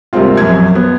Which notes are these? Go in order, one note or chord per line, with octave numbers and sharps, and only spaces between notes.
C3 G3 G#3 A#3 C4 F4
A#1 F#2 G#6
B3